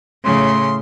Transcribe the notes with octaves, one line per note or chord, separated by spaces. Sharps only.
A2 C#3 C6